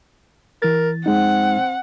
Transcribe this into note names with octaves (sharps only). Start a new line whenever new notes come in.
E3 A#4 A6
F2 G#3 C4 D#4 F#5